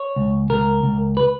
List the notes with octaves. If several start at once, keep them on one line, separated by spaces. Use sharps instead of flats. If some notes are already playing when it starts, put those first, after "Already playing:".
Already playing: C#5
C#2
C#2 A#4
C#2
B4